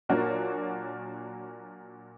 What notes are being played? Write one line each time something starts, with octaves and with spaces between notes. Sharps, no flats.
A#2 F#3 A#3 D4 F#4